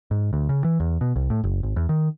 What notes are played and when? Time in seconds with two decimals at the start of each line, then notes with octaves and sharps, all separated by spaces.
0.11 G#2
0.33 D2
0.49 C#3
0.64 E3
0.80 E2
1.01 B2
1.16 C2
1.30 A2
1.44 F#1
1.63 G#1
1.76 E2
1.89 D#3